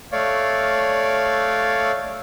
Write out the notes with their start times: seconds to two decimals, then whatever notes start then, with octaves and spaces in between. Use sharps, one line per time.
0.12 A3 C#5 D5 F5